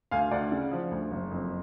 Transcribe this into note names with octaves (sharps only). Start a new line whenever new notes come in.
D2 F5 G#5
D2 D5 F#5
C#3
F3
D2
F#1
F2